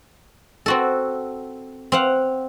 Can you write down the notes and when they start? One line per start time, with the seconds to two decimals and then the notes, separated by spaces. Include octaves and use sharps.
0.66 C4 F#4 A4
1.92 C4 F5 F#5